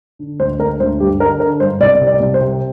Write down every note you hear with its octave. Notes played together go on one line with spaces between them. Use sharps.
D3
D2 C5
D2 A#4
D2 C5
G2 G4
D3 A#4
D3 A#4
G2 C5
C2 D5
C3
D5
C2
C5
C3